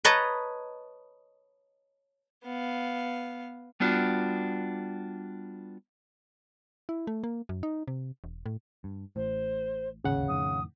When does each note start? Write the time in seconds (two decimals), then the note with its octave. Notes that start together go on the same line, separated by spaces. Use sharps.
0.05 B4 C#5 D#5 A5 A#5
2.44 B3 F5
3.80 G3 B3 D4 F4 F#4
6.89 E4
7.07 A3
7.24 A#3
7.49 F#2
7.63 D#4
7.88 C3
8.24 E1
8.46 A2
8.84 G2
9.16 A1 A2 C5
10.04 D1 G#1 D#2 C#3 F#5
10.28 F2 A2 D#3 D#6